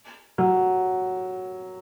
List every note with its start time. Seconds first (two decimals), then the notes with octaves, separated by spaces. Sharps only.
0.38 F#3